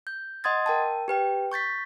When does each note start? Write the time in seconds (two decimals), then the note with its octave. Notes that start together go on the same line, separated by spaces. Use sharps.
0.07 G6
0.44 D#5 F#5 C6 D#6 G#6 A6
0.66 A#4 G5 A5
1.08 G4 B4 G5
1.52 C#6 G6 A6 B6